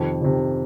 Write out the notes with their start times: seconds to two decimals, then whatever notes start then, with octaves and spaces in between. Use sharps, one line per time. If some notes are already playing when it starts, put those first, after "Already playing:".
Already playing: F2 C3 D#3
0.22 F2 C3 D#3